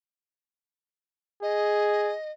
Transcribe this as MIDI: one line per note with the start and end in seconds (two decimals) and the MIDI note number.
1.43 2.15 68
1.43 2.31 75